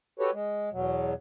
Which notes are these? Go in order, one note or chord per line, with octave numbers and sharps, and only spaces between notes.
F#4 G4 A4 B4 C#5
G#3
E2 B2 F#3